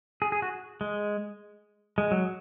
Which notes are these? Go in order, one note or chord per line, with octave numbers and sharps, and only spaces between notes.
G#4
G#4
F#4
G#3
G#3
F#3